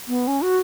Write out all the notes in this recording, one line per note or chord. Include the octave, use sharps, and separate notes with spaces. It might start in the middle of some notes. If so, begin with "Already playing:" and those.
B3
C#4
F#4